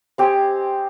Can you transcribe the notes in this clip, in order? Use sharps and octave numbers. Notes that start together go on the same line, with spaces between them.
C4 G4 D#5 G#5